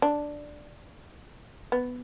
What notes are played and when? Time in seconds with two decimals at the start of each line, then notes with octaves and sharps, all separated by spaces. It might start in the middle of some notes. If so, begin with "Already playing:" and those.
0.02 D4
1.72 B3